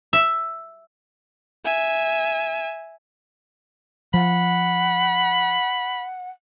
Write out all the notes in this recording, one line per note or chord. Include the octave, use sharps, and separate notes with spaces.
E5
E5 G#5
F3 F#5 B5